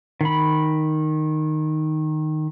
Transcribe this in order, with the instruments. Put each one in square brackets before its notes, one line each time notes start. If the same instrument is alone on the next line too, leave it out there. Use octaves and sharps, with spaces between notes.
[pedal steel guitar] D#3 B5